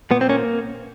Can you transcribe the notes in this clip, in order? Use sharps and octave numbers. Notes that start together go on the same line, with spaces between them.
A#2 B3
C4
A#3 C#4